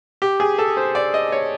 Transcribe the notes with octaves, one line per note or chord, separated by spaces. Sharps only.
G4
G#4
A4
C5
D5
D#5
C#5